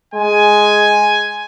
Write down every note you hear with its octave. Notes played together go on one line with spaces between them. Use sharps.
G#3 G#5